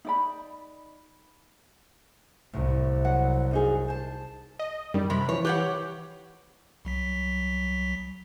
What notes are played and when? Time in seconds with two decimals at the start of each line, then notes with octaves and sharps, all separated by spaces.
0.05 D#4 D5 B5
2.54 C2 A2
3.05 F#3 F#5
3.51 F#2 D#4 G#4
3.88 C5 A5
4.59 D#5
4.94 F#2 D#3 G3
5.10 C3 B5 D7
5.29 E3 F3 C#5
5.45 E3 G4 B4 C#5 F#5 F#6 G6
6.85 C2 F#3 B6